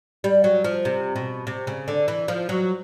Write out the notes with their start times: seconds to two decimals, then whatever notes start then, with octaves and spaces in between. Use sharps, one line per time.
0.24 G3
0.44 F#3
0.64 F3
0.85 C3
1.16 B2
1.47 C3
1.67 C#3
1.88 D3
2.08 E3
2.28 F3
2.49 F#3